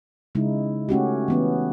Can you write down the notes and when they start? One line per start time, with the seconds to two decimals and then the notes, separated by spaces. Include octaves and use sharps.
0.35 C#3 G#3 D#4 E4
0.89 A3 C#4 F#4 G4
1.28 E3 B3 C#4